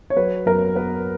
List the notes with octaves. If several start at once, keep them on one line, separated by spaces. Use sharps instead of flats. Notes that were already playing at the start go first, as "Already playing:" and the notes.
C#5
F#3 B4
F#2 A#4
B3 B4